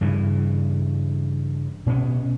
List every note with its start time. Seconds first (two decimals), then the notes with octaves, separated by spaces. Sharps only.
0.01 G2 C#3 E3
1.86 B2 B3 C#4